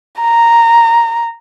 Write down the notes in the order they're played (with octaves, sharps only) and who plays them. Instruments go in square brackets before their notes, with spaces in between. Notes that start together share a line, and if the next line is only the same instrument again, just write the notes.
[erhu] A#5